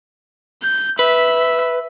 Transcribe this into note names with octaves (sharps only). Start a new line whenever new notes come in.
G6
B4 E5